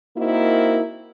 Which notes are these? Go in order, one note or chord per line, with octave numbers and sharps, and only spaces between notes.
A#3 C4 D#4 E4 F#4 A#4